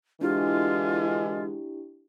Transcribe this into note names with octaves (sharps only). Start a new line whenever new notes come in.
D3 E3 G#3 D4 E4 F4 G4